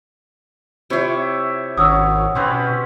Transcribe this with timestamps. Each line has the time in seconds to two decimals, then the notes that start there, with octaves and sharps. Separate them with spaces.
0.90 C3 E4 F4 C#5 E5
1.77 G#1 F#3 C#4 D#6 E6
2.35 B2 C4 C#4 B4